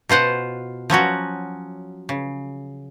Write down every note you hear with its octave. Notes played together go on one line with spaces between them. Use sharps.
B2 F4 C5 F#5
F3 F#3 C#4 F#4
C#3